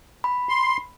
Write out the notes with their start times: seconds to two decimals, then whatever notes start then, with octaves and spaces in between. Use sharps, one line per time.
0.24 B5
0.49 C6